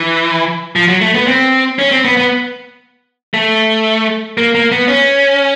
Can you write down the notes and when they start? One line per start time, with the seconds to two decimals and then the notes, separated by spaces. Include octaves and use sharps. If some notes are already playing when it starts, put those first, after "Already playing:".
Already playing: E3
0.76 F3
0.88 F#3
1.01 A3
1.14 B3
1.27 C4
1.79 C#4
1.91 C4
2.05 B3
2.17 B3
3.34 A3
4.38 A#3
4.55 A#3
4.72 B3
4.88 C#4